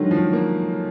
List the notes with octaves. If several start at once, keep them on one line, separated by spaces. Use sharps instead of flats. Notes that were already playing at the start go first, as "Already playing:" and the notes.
Already playing: D3 D#3 F#3 G#3
F3
D#3
A#3